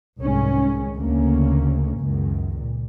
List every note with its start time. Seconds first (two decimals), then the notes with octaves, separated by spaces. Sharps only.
0.18 C2 G#2 D#3 G#3 C#4
0.95 D2 C#3 A#3 C#4
1.97 C#2 F#2 D#3
2.56 A#2